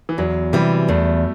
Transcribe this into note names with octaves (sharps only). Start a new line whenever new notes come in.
E3
E2 F#3
C3 E3 G3
E2 A3